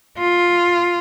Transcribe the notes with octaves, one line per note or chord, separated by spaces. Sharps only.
F4